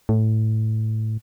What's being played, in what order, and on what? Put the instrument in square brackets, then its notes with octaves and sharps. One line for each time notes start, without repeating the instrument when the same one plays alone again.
[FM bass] A2